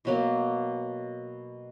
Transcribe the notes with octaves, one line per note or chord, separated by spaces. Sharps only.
B2 F#3 A#3